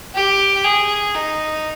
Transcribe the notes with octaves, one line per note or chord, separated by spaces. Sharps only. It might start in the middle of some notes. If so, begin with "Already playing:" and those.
G4
G#4
D#4